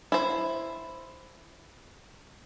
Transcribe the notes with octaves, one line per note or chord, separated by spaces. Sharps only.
E4 C5